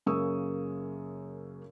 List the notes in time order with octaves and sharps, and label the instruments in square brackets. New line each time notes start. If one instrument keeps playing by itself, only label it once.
[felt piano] F#2 C#3 A#3 C#6 D#6 E6